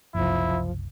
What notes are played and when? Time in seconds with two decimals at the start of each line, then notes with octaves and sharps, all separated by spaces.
0.15 F#1 C2 F3 E4